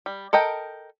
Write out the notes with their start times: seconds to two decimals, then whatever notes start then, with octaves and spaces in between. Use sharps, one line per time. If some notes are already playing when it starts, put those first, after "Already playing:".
0.06 G3
0.33 A4 A#4 D#5 G5